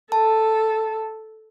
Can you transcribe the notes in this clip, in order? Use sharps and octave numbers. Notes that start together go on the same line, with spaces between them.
A4 A5